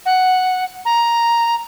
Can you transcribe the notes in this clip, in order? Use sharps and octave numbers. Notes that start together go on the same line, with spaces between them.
F#5
A#5